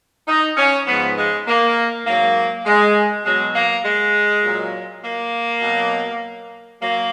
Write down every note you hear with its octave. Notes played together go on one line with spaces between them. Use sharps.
D#4
C#4
G#2 F3 B3
G#3
A#3
G#2 F#3 A#3
G#3
B2 F#3 G#3
A#3
G#3
A#2 F#3
A#3
B2 F#3
F#3 A#3